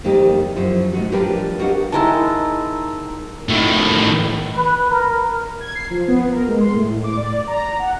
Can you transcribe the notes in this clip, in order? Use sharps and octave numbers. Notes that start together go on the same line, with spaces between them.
F2 D#3 G3 A#3 G4
F#2 F3 E4
A2 D#3 F#4
F3 G3 D4 G4 A#4 B4
F#4 G4 A#4 D#5 F5 F#5
D#3 G#3 E4 A5 A#5 E6
A2 D#3
B4
A#4
G#6
C7
F3
B3
A#4
G#3
C6
A2
D6
D5
A#5
F#5